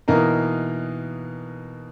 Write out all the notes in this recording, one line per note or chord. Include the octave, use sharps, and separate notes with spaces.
B2 E3 A#3 D#4 A#4